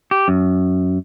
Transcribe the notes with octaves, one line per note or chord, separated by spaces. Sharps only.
G4
F#2